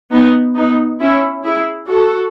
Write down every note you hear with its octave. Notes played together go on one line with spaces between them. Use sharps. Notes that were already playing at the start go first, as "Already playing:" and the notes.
B3 D#4
B3 D#4
C#4 E4
E4 G#4
F#4 A4